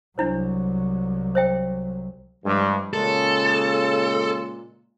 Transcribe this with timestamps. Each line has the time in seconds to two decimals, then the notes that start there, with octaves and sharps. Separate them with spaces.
0.18 C2 F#3 D4 E4 C5
1.35 C5 E5 G5
2.44 G2 E3 F3 G#3
2.93 A#2 C#3 G#3 A#3 A4